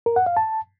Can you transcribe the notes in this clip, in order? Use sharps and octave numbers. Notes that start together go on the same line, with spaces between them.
A#4
F#5
F5
A5